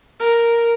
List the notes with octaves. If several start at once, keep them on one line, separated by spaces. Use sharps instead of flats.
A#4